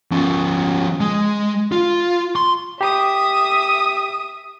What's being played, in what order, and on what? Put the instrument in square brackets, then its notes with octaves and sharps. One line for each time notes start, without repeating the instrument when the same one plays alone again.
[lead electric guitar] F3 C#4
G#3
F4
C6
[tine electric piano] G4 [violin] E5 D#6